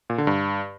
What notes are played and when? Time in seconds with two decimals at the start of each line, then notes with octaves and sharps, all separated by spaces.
0.10 A#2
0.18 D3
0.27 G2